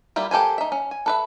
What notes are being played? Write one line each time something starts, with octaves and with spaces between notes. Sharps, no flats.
G3 A#3 E4 F4 E5
A#3 G4 A4 C5 G#5
D#4 E5
C#4
G#5
A4 B4 E5